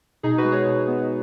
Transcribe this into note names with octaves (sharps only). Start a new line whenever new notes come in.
B2 D#4 G#4
F#4 B4
G#3
G#4 C#5
B2
B3